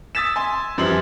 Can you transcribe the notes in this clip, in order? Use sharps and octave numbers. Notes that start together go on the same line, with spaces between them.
D#6 E6 A6 B6 E7
G#5 C6 E6
F#2 E3 F3 G3 C6 F#7